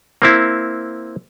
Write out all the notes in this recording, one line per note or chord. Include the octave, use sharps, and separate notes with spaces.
A#3 C4 E4